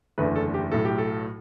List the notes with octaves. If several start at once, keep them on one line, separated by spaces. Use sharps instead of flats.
F#1 E2 D3 A3 B4
A4
G4
B1 A2 F#3 A3 A4
G4
A4